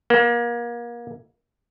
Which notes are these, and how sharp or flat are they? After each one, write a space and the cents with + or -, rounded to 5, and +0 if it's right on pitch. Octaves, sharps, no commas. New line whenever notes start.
A#3 +30